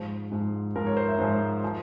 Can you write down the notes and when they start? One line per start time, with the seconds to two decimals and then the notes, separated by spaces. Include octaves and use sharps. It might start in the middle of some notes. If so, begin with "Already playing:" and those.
Already playing: G#2 F3 C5
0.31 G#2 F3
0.75 G#2 F3 A#4
0.87 C#5
0.97 C5
1.08 E5
1.19 G#2 F3 C5
1.64 F3